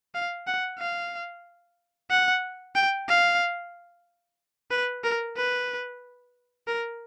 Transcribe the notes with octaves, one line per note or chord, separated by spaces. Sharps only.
F5
F#5
F5
F#5
G5
F5
B4
A#4
B4
A#4